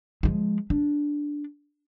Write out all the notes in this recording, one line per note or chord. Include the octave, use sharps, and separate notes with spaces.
F3 G#3
D4